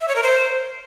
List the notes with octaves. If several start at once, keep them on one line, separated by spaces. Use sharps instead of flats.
E5
C#5
A#4
C5